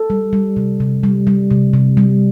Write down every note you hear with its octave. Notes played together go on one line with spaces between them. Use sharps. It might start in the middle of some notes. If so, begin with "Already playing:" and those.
Already playing: A4
G3
G3
C3
C3
G3
G3
C3
C3
G3